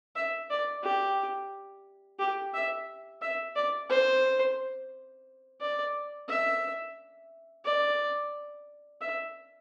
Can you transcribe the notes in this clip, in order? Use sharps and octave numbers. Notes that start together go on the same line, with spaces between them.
E5
D5
G4
G4
E5
E5
D5
C5
D5
E5
D5
E5